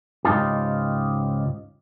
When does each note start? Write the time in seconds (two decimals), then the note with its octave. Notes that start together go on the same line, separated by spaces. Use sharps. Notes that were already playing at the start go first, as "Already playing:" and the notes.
0.25 C#2 G#2 D#4 F4 G4